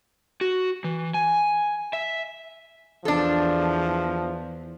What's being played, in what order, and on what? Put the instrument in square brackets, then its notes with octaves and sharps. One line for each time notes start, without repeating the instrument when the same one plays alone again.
[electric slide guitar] F#4
E3
G#5
E5
[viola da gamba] E2 [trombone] F3 [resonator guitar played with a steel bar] D4 A4